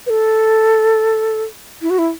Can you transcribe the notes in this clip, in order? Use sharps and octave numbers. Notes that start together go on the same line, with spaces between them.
B4
A4
E4
F#4
E4